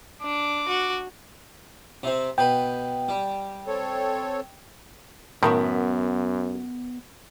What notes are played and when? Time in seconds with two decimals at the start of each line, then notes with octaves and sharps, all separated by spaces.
0.22 D4 D6
0.68 F#4
2.03 C3 C4
2.38 B2 B4 G5
3.09 G3
3.67 C4 A4 C#5
5.43 F#2 A2 D#3 B3 A#4 E5